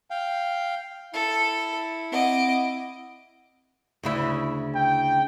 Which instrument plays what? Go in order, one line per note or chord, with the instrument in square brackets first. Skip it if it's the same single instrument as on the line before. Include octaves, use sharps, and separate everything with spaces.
[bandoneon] F5 G5
[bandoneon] E4 [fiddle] A4
[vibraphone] C4 F#5 [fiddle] D#5 D6
[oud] D2 C#3 E4
[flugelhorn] G5